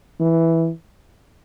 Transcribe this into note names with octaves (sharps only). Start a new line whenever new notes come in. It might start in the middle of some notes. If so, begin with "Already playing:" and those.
E3